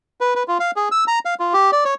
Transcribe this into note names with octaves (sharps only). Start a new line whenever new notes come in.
B4
B4
F4
F5
G#4
E6
A#5
F5
F4
G4
D5
C#5